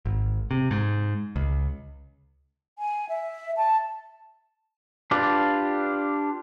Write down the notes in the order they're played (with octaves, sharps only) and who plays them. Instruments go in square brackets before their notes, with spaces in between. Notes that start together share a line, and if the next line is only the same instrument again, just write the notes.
[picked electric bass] G#1
C3
G#2
C#2
[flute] G#5
E5
A5
[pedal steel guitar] D4 F4 G4 B4 D5